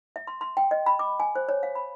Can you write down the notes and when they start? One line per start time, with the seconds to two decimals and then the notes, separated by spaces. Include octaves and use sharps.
0.16 E5
0.27 C6
0.41 C6
0.57 G5
0.71 D#5
0.86 B5
0.99 D6
1.20 G#5
1.35 C5
1.49 C#5
1.63 F5
1.75 B5